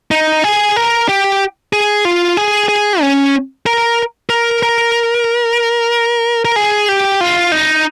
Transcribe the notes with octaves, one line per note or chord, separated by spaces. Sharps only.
D#4
G#4
A#4
G4
G#4
F4
G#4
G#4
C#4
A#4
A#4
A#4
A#4
G#4
G4
F4
D#4